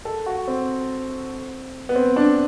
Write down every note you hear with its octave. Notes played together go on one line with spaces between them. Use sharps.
A4
F#4
C4
B3
C4
D4